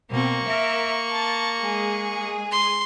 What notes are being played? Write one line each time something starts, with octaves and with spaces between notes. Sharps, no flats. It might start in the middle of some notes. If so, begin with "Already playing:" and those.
B2 A#3 C4 C#6
A#4 E5
A5 A6
G#3 G#4
C6